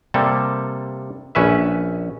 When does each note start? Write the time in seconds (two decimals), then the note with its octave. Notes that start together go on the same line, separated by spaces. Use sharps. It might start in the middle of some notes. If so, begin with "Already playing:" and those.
0.14 C3 G3 A#3 A4
1.35 A#1 C#4 B4 E5